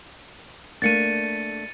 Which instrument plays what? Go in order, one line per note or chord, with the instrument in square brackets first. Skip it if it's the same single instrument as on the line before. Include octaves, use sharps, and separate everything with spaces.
[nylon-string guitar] A3 A#3 D4 [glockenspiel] A6 C#7 D#7